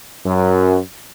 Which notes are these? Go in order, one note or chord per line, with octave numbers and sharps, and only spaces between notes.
F#2